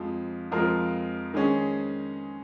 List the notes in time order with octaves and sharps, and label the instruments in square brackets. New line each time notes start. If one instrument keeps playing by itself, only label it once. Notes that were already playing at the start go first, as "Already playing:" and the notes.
Already playing: [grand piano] F2 F3 G#3
F2 F3 G#3 F4 A#4
D#3 G#3 C#4 G#4